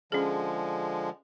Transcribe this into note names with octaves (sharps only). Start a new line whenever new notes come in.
D3 F3 G#3 C#4 G#4